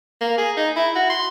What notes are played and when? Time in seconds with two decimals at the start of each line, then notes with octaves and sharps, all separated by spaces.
0.21 A#3
0.38 G#4
0.57 D#4
0.76 E4
0.96 F#4
1.10 C6